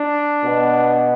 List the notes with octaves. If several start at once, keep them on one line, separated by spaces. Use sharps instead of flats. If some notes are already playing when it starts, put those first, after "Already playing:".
Already playing: D4
B2 B3